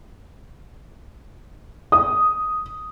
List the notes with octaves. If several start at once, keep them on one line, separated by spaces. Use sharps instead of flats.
D#6